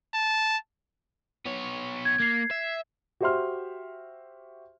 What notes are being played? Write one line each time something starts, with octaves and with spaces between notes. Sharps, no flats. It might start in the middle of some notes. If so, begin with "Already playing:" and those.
A5
B3 C#5
G#6
A#3 G#6 C7
E5
F#4 G4 C5 E5 C6 F6